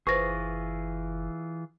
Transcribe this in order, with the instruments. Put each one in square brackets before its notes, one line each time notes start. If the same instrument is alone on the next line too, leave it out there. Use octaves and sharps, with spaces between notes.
[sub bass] F#1 [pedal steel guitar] E3 F4 G#4 [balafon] B4 C5 [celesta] C#6 A#6